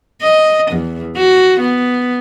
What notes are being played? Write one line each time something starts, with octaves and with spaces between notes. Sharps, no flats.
D#5
E2
F#4
B3